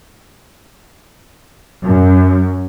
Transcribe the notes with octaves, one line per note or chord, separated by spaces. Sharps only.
F#2